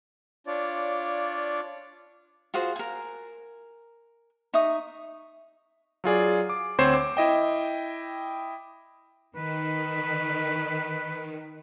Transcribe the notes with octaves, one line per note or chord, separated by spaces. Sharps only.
D4 F4 C#5 D5
F4 F#4 G#4 C5
A#4 G#5
D#4 E5 C#6 D#6
F#3 F4 G#4 D5
D6
D2 C4 C5 C#5 C7 E7
D6
E4 D#5 G5
D#3 B4